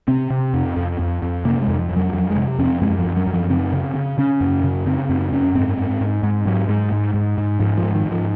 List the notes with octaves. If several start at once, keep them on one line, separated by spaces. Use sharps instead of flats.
C3 C4
C3
F2
F2
F2
F2
C3 A#3
G#3
F2
F3
F2
F#3
F2 F#3
G#3
C3
F2 C#4
C4
F#2 G#3
F3
F#2
F#3
F#2
F3
C#3 C4
C#3
C#3
C#3 C#4
F#2
C#3
C#3 C4
F#2 C4
F#2 C#4
G#2 C4
G#2
G#2
G#2 G#3
G#2 F#3
G#2 G#3
G#2
G#2
G#2
G#2 F3
F3
G#2
D#3
G#2
F3